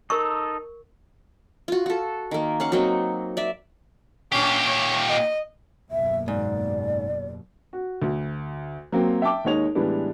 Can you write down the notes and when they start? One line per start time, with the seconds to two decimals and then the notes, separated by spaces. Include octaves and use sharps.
0.10 D#4 A4 A#4 C#6
1.68 F4 F#4
1.86 F#4 A4
2.31 D#3 A#3
2.60 C#4 F5 F#5
2.72 F#3 A#3 C4 D#4
3.37 D5 E5
4.32 A#2 C#4 D4 G4
4.66 C#5
5.09 D#5
5.91 F#1 D#2 B2 E5
6.28 G#2 D5
7.73 F#4
8.02 D2
8.92 F#3 A#3 C4
9.22 E5 G5 A5 D6
9.45 D#2 G#3 D#4 C#5 F7
9.75 A2 E3 G3 G#3 B3 D4